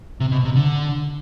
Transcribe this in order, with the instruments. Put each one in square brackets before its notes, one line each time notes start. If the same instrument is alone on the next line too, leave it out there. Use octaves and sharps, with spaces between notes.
[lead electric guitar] C3
B2
C3
D3